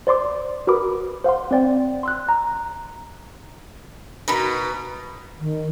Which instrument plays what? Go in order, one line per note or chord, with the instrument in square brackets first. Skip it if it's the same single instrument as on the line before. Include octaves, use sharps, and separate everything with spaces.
[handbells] C5 D5 C6 D6
F#4 A#4 B4 B5 D6 D#6
C5 F5 F#5 C6
C4 C5 D5 G5
C6 E6 F#6
A#5
[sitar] B2 B4 [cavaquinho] D#4 A#4 B5
[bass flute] D#3